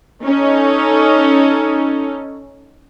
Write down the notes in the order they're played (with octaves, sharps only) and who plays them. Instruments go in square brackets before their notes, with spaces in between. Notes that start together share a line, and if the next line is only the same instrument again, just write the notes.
[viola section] C#4 D#4 A4